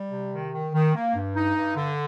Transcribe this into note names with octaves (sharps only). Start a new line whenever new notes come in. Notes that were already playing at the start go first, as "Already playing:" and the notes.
Already playing: G3
C3
D#3
D#3
D#3
A#3
G2
D#4
G2
D3